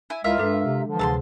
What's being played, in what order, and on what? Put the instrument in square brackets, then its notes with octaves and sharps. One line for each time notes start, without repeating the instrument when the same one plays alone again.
[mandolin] E4 G#5
[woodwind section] C#2 G#3 E4 [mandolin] F4 A#4 E5
[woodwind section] G2 [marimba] G#3 D4 A4
[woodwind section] C3
D3 E3 F3
[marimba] D2 C3 G#4 [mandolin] A5 A#5 C6